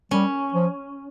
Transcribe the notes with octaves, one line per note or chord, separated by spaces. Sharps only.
G3 C#4
F3